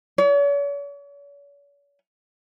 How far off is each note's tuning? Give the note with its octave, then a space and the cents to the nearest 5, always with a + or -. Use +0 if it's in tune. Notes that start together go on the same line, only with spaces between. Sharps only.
C#5 +45